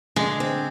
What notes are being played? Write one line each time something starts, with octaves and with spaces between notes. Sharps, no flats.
D3 G#3
C4